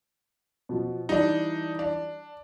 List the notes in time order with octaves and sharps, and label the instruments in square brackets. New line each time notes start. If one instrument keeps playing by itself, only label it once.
[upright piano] B2 F3
[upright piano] E3 G3 [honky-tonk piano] D4 D#4
[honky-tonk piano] D4